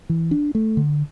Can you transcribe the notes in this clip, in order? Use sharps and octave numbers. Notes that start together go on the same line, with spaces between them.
E3
D4
A3
D3